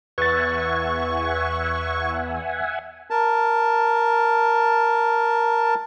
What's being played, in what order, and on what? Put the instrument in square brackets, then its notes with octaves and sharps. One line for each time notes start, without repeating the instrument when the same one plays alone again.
[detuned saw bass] E2 [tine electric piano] B4 A6 [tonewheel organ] E5 F#5 G#5 [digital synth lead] C#6
[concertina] A#4 A5